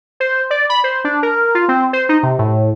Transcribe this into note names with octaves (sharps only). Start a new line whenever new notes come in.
C5
D5
B5
C5
D4
A#4
F4
C4
C5
D#4
C3
A2